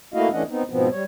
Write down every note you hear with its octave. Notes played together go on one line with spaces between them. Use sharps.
A3 A#3 E4 F#4 D#5 F5
E3 A3 C#4 D4 D#5 F#5
B3 C4 D#4
G#2 B2 F3 B3 C4
G3 C#5